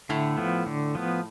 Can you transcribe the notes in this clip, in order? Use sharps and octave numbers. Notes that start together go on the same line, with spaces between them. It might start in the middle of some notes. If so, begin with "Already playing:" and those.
A2 D3 A3
F3 B3
D3
F3 B3